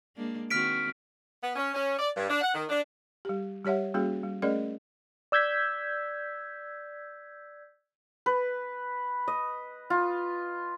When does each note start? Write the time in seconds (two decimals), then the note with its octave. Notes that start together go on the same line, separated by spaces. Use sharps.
0.16 G#3 A#3 D4
0.50 D#3 C4 F#4 F6 B6 D7
1.42 B3
1.56 C#4
1.74 C#4
1.99 D5
2.15 G2
2.30 D4
2.42 F#5
2.54 D#3
2.69 D4
3.25 G3 G4
3.65 G3 G4 C#5 E5 F#5
3.94 G3 A#3 C#4 F#4 G#4
4.23 G3
4.42 A3 C#4 G#4 A#4 D5 D#5
5.32 D5 E6 G6 G#6 B6
8.26 B4
9.28 D#5
9.90 F4